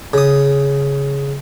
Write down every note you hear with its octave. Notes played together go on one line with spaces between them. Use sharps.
C#3 D#6